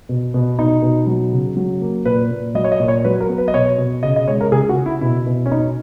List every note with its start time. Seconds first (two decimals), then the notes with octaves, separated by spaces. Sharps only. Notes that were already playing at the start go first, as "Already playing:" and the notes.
0.09 B2
0.34 B2
0.59 B2 D#4
0.82 B2
1.07 F#3
1.33 C#3
1.57 F#3
1.81 A#3
2.06 A#2 B4
2.31 A#2
2.55 F#3 D#5
2.64 C#5
2.72 D#5
2.80 A#2
2.88 C#5
3.04 F#3 B4
3.21 A#4
3.29 B3
3.38 B4
3.48 D#5
3.54 B2 C#5
3.78 B2
4.03 C#3 D#5
4.16 D#5
4.28 G#3 C#5
4.41 A#4
4.52 C#3 G#4
4.69 F#4
4.77 C#3
4.86 E4
5.01 B2 E4
5.26 B2
5.46 C#4
5.51 B2 D#4